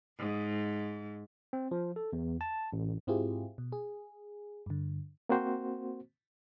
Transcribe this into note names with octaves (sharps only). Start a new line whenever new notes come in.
G#2
C4
F3
A4
E2
A5
A1
G#2 C4 E4 F4 G4 G#4
B2
G#4
G2 D3
A#3 C4 F#4 C5